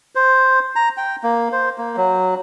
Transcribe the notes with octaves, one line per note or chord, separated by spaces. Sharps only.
C5
A#5
G5
A#3
C5
A#3
F#3